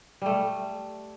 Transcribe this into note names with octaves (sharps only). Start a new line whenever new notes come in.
G3 A3